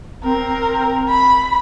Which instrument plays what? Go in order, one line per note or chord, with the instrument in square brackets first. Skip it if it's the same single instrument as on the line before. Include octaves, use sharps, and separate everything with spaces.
[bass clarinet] C4 [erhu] A#4
[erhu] B5